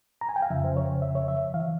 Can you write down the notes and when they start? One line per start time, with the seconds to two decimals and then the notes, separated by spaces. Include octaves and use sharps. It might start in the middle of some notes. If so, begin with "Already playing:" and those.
0.21 A#5
0.29 G#5
0.36 G5
0.42 F5
0.50 F2 C#3 F3 E5
0.64 C5
0.77 C#5
1.02 E5
1.15 C#5
1.28 E5
1.54 E3 F5